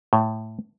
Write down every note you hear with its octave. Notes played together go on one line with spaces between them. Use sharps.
A2